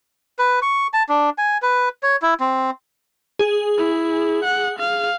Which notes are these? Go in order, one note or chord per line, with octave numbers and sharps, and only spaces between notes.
B4
C#6
A5
D4
G#5
B4
C#5
E4
C4
G#4
E4
F#5
F5